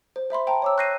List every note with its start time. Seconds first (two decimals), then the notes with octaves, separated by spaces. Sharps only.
0.16 C5
0.30 C5 E5 B5 C6
0.47 C5 G5 A5 A#5
0.62 C#5 D6 E6
0.77 C#6 F#6 G6 A#6 C7 D#7